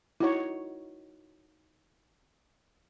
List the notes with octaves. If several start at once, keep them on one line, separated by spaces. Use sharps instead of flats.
D#4 E4 F#4 C#5